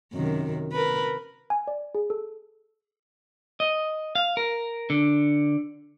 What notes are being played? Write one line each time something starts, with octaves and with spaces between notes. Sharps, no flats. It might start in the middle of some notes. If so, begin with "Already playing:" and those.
F#2 C3 D#3
A#4 B4
G#5
D5
G#4
A4
D#5
F5
A#4
D3